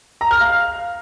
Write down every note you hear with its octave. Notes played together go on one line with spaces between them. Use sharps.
A#5
F6
F5